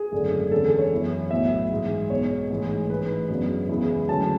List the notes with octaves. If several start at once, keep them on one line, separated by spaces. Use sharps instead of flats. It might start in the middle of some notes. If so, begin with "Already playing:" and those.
Already playing: G#4
G#1 F#2 D3 A3 D4
E2 D3 G#3 C#4 A4
A4
C#5
F#2 E3 B3 E4
B1 A2 F#3 B3 E4 E5
G#2 E3 G#3
B1 B2 G#3 C#5
A1 G#2 E3 G#3
A1 G#2 E3 B4
F#2 C#3 F#3 B3 D4
E2 C#3 G#3 B3 E4
D2 C#3 F#3 C#4 A5